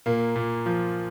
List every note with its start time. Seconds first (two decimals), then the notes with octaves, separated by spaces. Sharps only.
0.06 A#2 A#3
0.35 A#2
0.66 F3